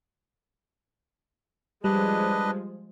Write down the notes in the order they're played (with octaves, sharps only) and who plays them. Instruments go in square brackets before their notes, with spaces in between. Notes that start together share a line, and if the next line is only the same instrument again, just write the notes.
[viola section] F3 G#3 [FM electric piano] G3 [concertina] D4 B4 D#5